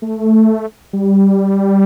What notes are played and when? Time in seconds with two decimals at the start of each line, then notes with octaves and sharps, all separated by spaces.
0.02 A3
0.93 G3